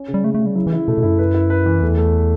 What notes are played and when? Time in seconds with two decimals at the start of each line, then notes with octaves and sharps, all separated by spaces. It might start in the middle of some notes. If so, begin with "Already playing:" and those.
Already playing: C#4
0.08 C#3
0.14 G3
0.24 C#3 A3
0.34 A3
0.40 C#3
0.46 G3
0.55 F#3 E4
0.67 E3
0.72 E4
0.88 B2 A3
0.98 B2
1.03 G2 E4
1.08 F#2
1.18 B4
1.34 E4
1.50 B4
1.66 E3
1.82 E2 A3
1.97 A3